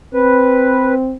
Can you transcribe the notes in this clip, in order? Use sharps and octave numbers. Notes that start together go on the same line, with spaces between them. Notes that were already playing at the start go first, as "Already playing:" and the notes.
C4 B4